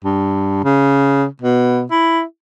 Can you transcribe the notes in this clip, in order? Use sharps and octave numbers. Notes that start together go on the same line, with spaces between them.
G2
C#3
B2
E4